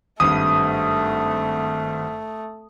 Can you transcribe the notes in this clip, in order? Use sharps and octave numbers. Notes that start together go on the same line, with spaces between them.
G#1 G2 A3 D#6